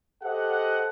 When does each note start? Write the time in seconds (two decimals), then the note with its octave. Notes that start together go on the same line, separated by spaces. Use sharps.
0.24 G4 A4 C5 D#5 F#5